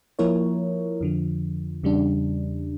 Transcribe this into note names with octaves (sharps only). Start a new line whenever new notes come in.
F3 A#3 E4 A#4 C#5
F2 D3 F3
E2 C#3 G3 D4